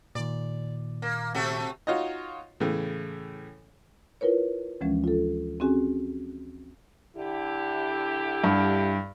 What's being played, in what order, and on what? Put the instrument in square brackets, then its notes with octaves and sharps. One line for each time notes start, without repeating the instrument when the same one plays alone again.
[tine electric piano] A#2 D#3 [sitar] D5
[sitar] A#3
C3 A3 F#4
[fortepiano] D#4 F4 F#4 C#5 D#5
A2 C#3 E3
[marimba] E4 F4 A#4 B4 C#5
D2 E3 F3 G#3 C#4
F4 A4
C4 C#4 F#4 G#4 G#5
[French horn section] D3 E4 G4
[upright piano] G2